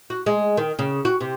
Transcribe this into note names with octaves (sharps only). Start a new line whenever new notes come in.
F#4
G#3
D#3
C#3
F#4
C3